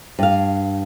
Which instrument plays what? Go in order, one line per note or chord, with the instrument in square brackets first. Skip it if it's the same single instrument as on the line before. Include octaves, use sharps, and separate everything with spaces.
[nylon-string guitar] G2 F5